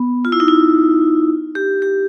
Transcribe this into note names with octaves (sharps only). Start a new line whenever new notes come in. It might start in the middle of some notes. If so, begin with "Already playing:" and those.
Already playing: B3
F4
E4
D#4
E4
G4
G4